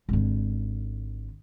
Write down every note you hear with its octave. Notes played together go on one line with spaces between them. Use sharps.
G#1 D3